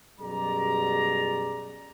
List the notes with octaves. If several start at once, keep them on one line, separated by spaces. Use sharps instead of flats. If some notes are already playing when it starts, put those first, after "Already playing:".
F#2 B2 G3 G#4 D5 A#5